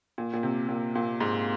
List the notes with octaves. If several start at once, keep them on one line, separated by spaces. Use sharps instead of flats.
A#2
A#2
C3
A#2
A#2
G#2